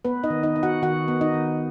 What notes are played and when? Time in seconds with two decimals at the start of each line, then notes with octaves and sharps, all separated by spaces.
0.05 B3 B4
0.23 D#4 D#5
0.30 D#3
0.43 D#4 D#5
0.56 D#4
0.63 F#4 F#5
0.82 D#3 F#4 F#5
1.08 B3
1.21 D#4 D#5
1.34 D#3